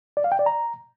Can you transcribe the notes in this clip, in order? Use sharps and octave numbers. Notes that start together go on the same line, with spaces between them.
D5
F5
G5
D5
A#5